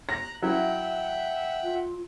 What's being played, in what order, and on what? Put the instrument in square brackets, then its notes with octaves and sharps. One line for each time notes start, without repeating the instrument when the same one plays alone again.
[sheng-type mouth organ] A#5 F#6 [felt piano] A#6
[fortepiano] F#3 E4 [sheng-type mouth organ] E5 F#5 G5
[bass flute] F4